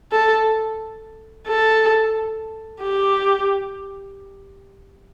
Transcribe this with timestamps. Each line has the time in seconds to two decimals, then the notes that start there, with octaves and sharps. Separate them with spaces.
0.12 A4
1.47 A4
2.82 G4